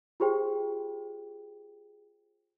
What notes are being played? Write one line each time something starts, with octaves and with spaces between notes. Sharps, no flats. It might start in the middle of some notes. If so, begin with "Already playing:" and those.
F4 G4 G#4 C5 G5